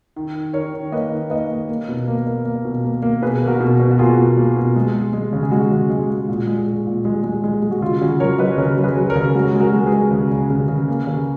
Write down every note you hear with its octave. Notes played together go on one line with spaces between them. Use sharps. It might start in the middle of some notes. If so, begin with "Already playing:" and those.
D#3
D#3
D#3 A#4 C#5
D#3
A#3 B4 D#5
D#3
A#3 B4 D#5
A#3
A#3
B2
A#3
A#3
A#3
B2
A#3
A#3
B2 G#4 B4
A#3
F#4 A#4
B2
B2
F#4
A#3 F4 G#4
B2
A#3
B2
G#3
G#3
G#3
C#3
G#4
G#3 F#4
C#3
G#3
G#3
A#2
G#3
G#3
A#2
G#3
G#3
G#3
G#3
F#4
C#3 F4
C#3 F#4
F#3 A#4 C#5
F#3 B4 D#5
C#3 A#4 C#5
F#3
G#4 B4
F#3
A#4 C#5
C#3
G#3 F#4
G#3
F#4 A#4
G#3
G#4 B4
G#3
C#3
C#3
C#3
C#3
A#3
C#3